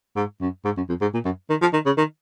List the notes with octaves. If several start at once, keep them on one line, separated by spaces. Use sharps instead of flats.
G#2
F#2
G#2
F#2
F2
G#2
A#2
F#2
D#3
F3
D#3
C#3
D#3